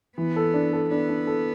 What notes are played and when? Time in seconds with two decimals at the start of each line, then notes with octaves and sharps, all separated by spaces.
0.17 E3 B3
0.36 A4
0.54 D4
0.73 A4
0.90 B3 D4
1.09 D4
1.27 A4